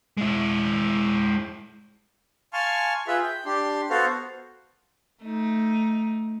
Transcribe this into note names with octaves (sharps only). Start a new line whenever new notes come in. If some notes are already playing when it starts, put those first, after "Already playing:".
G#3 E4
F5 G#5 A5 C6 C#6 F6
F4 G#4 B4 E5
G5
D4 G4 C6
B3 F#4 A4 C5 F5
A3 D#4